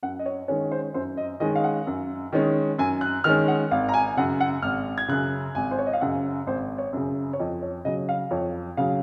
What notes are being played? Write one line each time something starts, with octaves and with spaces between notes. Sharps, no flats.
F#2 F#5
D#5
C#5
D#3 G#3 C#4 C#5
C5
F#2 C5
D#5
D#3 G#3 C#4 D#5
F5
F#5
F#2
D#3 G#3 C#4
F#2 G#5
F#6
D#3 G#3 C#4 F6
F#5
G#1 F5
A#5
G#5
F#2 C#3 F#5
F#5
G#1 F6
G#6
F#2 C#3 F#6
G#1 G#5
C5
C#5
D#5
F5
F#2 C#3 F#5
G#1 C5
C#5
F#2 C#3
C#5
F2 D#5
C#5
C#3 F#3 D#5
F5
F2 C#5
C#3 F#3 F5